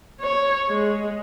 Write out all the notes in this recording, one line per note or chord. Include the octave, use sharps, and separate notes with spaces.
C#5
G#3